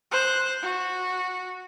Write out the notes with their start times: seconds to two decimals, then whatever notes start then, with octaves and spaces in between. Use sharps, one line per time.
0.11 C5 F#6
0.62 F#4